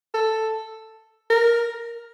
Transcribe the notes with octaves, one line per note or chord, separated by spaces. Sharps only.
A4
A#4